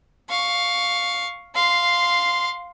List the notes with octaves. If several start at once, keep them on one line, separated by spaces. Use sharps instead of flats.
F5 C#6
F5 C6